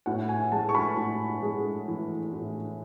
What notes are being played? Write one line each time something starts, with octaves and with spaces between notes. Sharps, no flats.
A2 F#5
G#5
G#3 A5
C#6
B5
A2
G#3
E3
A2